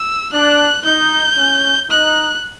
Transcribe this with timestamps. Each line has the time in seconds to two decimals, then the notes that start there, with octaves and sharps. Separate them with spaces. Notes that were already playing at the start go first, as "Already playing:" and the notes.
Already playing: E6
0.33 D4 F#6
0.85 D#4 G6
1.37 C#4
1.90 D#4 F#6